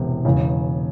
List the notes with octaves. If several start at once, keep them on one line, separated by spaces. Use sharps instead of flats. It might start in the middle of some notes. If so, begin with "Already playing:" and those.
Already playing: E1 E2 C3
E1 E2 C#3